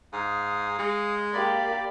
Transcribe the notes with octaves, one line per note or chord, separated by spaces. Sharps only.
G#2 F5 D#6
G#3
A#3 G4 D5 B5